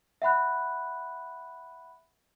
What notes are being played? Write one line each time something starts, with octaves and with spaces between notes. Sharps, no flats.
E5 F#5 B5 F#6